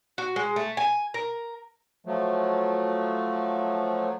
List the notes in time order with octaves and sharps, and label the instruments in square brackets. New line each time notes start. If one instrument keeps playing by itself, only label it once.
[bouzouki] F#4
G#3
A3
G#5
A#4
[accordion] F3 F#3 A3